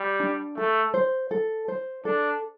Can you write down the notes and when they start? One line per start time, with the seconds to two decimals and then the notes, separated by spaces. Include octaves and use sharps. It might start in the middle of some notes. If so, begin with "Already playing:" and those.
Already playing: G3
0.20 D4
0.57 A3 A4
0.94 C5
1.31 A4
1.68 C5
2.05 D4 A4